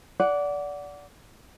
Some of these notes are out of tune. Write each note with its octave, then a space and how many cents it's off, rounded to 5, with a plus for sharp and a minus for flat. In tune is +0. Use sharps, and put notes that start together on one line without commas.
D5 -20 F#5 +0